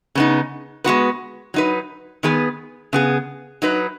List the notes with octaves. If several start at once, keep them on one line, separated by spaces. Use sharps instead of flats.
C#3 B3 D#4
G#3 B3 F#4 B4
F#3 D#4 B4
D#3 B3 G#4 B4
C#3 B3 G#4
F#3 D#4 B4